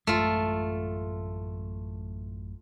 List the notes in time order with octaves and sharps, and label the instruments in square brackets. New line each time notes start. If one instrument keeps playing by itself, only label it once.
[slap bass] A1 F#2 G#3 [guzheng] A3 F4